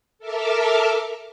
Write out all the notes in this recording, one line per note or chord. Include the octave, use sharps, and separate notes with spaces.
A4 A#4 E5 A5 D6 F6